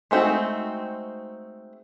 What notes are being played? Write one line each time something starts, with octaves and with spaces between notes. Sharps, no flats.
G#3 A3 C4 D#4 F#4